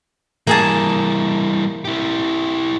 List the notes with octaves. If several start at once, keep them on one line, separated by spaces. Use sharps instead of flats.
E3 G3 A#3 G#4 A5
E4 G4